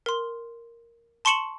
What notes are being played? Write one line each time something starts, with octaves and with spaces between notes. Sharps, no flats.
A#4 C6
A5 C6 C#6 C#7 E7 F#7